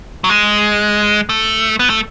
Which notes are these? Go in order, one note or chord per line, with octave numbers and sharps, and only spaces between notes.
F#3
G#3
A3
B3
A3